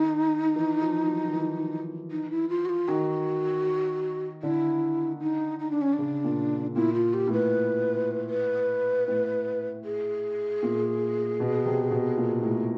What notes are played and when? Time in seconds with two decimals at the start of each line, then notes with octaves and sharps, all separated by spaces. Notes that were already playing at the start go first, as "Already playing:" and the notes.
Already playing: D#3 D#4
0.56 E3
0.81 F3
1.07 F#3
1.25 D#3
1.33 E3
2.11 D#4
2.31 E4
2.49 F4
2.65 F#4
2.69 F4
2.88 D#3 F#4
4.43 D3 E4
5.21 D#4
5.59 D#4
5.71 D4
5.82 C#4
5.93 D4
5.98 C#3
6.24 A#2
6.76 A#2 E4
6.94 F4
7.14 G4
7.27 A2
7.33 B4
8.30 B4
9.08 A2
9.84 G#4
10.63 A#2
11.40 B2
11.65 C3
11.91 B2
12.17 A#2
12.42 A2